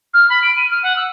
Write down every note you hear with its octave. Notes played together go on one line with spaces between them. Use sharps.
F6
B5
D7
D#7
F6
F#5
E6